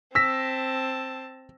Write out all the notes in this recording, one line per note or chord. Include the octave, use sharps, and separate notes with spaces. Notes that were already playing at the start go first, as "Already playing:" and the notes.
C4 A5 E6 A#6 B6